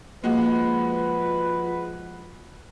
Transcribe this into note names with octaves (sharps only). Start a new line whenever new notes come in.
F3 G#3 A#3 F#4 B4